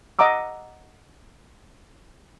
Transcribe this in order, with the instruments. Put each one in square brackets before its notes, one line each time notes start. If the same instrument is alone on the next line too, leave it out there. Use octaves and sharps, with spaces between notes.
[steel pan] D#5 F#5 A#5 D6 E6